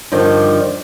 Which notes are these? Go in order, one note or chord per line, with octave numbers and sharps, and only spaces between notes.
G2 D3 D#3 F3